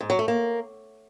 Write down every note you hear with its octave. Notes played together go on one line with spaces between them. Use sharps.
G#2
F#3
A3
A#3